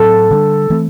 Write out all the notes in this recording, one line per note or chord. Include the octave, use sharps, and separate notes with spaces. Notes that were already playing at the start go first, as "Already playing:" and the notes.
Already playing: A2 F#3 C4 A4
D3 G3 B3 D4
E3 A3 C4